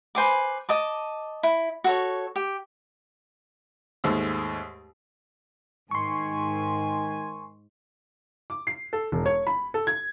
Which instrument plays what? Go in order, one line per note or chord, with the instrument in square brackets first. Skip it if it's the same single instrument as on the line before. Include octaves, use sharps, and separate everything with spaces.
[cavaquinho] B4 C5 G#5 D6
D#5 A5 D6
E4
F#4 A4 C#5
G4
[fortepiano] D#2 G#2 G#3 A3 E6
[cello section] G#2 [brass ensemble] D#3 G#5 [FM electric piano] C6 C#6
[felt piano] D6
C7
A4
E1
C#5
B5
A4
G#6